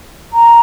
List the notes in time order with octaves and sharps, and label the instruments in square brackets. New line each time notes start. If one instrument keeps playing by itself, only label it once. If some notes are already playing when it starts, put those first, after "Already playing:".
[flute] A#5